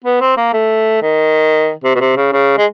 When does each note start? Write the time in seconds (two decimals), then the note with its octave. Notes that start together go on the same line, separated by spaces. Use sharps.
0.04 B3
0.21 C4
0.37 A#3
0.53 A3
1.02 D#3
1.84 C3
1.95 B2
2.00 C3
2.17 C#3
2.33 C#3
2.58 G#3